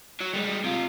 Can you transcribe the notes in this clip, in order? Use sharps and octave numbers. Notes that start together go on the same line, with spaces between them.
F#3
G3 G#3
C3 F4